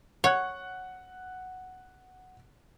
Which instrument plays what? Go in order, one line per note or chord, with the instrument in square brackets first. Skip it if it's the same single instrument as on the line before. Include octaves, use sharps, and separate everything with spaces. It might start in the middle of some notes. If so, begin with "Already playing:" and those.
[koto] C#5 [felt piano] F#5 F#6